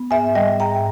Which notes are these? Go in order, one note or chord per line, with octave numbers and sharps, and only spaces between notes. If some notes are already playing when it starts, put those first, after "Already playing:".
Already playing: B3
G#2 E5 G#5
G3 D#5 G5
G#2 G5 A#5